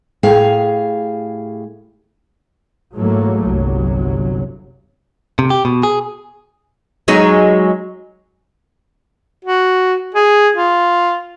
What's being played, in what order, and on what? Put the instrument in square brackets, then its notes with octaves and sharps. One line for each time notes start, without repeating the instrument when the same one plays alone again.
[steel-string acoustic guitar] A2 G4 G#4 F5
[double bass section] G#2 E3 F#3 A3 A#3
G1 C2 F#3
[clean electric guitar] C3
G4
B2
G#4
[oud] F#3 G#3 D#4
[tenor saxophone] F#4
G#4
F4